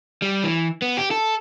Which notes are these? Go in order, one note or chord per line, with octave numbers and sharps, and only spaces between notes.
G3
E3
B3
G4
A4